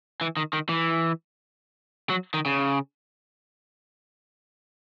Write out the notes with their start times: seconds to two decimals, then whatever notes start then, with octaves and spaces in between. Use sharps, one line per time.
0.21 E3
0.37 D#3
0.53 D#3
0.69 E3
2.10 F#3
2.34 D#3
2.46 C#3